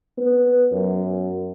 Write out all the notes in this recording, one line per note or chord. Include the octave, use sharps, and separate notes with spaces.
B3
F#2